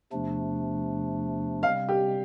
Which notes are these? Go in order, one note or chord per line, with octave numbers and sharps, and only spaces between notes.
E2 C3 F3 A3 D4
C3 G3 C4 F5
G4